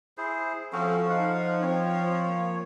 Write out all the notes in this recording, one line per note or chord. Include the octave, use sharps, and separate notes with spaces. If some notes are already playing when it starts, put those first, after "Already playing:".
E4 G#4 C5
F3 C4 C#4 F#4 A4
D#4 F5 F#5
C4 C#5
A#3